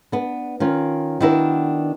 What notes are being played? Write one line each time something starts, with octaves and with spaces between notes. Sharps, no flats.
B3 D4
D#3 C#4 F4
D#3 B3 D4 E4 F#4 A#4